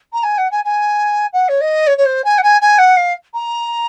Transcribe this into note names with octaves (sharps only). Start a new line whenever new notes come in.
A#5
G#5
F#5
G#5
G#5
F#5
C#5
D#5
C#5
C#5
C5
G#5
F#5
G#5
G#5
F#5
F5
A#5